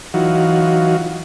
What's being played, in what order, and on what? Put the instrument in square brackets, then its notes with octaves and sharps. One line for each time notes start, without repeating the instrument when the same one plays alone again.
[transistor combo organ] E3 F#3 D#4 F4 F#4